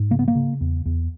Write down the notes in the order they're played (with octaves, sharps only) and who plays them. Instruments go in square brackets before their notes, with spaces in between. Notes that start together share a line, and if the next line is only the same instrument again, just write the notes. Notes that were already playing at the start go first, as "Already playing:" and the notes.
Already playing: [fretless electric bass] G#2
C#3 A#3
B3
A#3
C#3
E2
E2